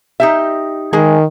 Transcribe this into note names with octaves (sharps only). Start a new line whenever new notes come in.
D#4 G4 E5
D#3 G#3 G#4